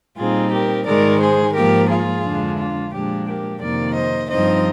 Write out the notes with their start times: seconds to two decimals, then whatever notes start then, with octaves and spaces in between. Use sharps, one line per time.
0.18 A#2 G3 C4 D#4 F4 G#4
0.52 G4 A#4
0.87 G#2 D#3 G#3 A#4 D5
1.21 G#4 C5
1.55 G#2 F3 A#3 G4 A#4
1.90 F4 G#4
2.24 F2 D3 G#3 D4
2.58 F4
2.92 A#2 F3 G#3 D4 G4
3.27 G4 A#4
3.61 F2 C3 D#3 A#3 A#4 D5
3.95 C5 D#5
4.30 G2 F3 C4 D#4 C5 D#5